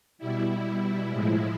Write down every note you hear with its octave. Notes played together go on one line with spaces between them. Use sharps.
B2 G3 E4
A2 F3 G#3